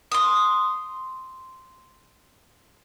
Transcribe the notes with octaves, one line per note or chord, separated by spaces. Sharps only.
C6 D#6